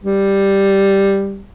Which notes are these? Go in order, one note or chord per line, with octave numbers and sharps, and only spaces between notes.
G3